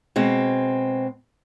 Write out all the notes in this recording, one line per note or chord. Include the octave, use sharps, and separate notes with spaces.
B2 G#3 C4